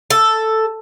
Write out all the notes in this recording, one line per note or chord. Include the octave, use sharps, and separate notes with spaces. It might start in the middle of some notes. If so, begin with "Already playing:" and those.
A4